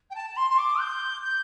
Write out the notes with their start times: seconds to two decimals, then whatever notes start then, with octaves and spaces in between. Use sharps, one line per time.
0.10 G5
0.15 A5
0.30 A5
0.36 C6
0.50 C6
0.58 D6
0.80 G6
1.22 G6